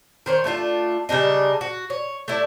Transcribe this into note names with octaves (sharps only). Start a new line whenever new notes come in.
D#3 C5 C#5
A3 D4 D#4 F4
C#3 G3 D4 D#4
F#4
C#5
A3 D4 E4 D5